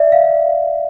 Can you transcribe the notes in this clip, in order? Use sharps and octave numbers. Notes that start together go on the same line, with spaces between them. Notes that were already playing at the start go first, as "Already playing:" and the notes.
Already playing: D5 E5
F5